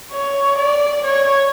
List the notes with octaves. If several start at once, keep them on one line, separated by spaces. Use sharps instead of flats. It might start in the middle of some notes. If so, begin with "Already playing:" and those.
C#5
D5
C#5